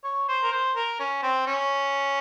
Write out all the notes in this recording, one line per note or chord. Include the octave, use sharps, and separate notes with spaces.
C#5
C5
A#4
C5
A#4
C#4
C4
C#4